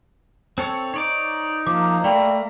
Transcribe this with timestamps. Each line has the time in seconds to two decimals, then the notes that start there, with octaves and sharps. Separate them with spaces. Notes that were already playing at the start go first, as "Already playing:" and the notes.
0.58 C4 A4 C5 C#5
0.94 D#4 C#5 D5 D6
1.67 F3 A#3 A#4 D6
2.04 A3 D5 G5 B5